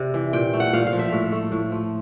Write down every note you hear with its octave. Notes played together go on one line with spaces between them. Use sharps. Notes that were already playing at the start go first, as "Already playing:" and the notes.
Already playing: C3 D5
E3
A#2 G5
A3
F#5
A#2 F5
F5
F3
E5
A2
A3
A2
F3